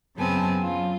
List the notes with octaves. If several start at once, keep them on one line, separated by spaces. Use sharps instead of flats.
F#2 C#3 B3 C4 G#5 A5
F#3 F4